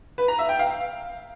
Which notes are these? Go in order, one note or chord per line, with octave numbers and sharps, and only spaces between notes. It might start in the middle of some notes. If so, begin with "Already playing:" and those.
B4
A#5
E5
G5
F5